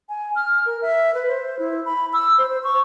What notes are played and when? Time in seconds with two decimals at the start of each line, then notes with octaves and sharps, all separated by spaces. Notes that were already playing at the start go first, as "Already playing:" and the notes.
0.09 G#5
0.36 F6
0.66 A#4
0.82 E5
1.14 B4
1.28 C5
1.59 E4
1.85 B5
2.13 E6
2.38 C5
2.50 C5
2.64 C#6